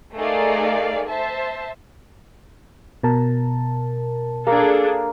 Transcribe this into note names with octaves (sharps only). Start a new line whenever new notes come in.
A3 D#4 G#4 A#4 D5 F5
C5 E5 A5
B2 A#4 A5
A#3 D4 G#4 A4